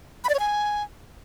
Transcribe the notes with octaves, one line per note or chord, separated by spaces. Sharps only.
B5
D5
C#5
G#5